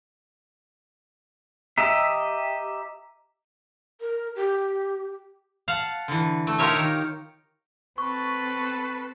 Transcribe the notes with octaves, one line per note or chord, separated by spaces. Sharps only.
G4 D#5 E5 A#5
A#4
G4
F5 F#5 A5
D3 E3
A3
D#4 F4 G4 A#4 C#5 E5
D#3
C4 A4 B4 C#6